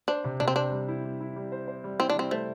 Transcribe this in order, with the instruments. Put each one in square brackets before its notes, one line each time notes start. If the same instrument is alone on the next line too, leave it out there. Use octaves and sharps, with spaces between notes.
[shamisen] D4 [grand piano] C5
[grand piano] C3
[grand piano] C3 [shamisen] D4
[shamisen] C4
[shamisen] D4 [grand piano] C5
[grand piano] G3
E4
G3
E4
G3
C5
C5
G3
[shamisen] C4 [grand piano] E4
[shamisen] D4
[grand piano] G3 [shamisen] C4
[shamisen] A3 [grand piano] C5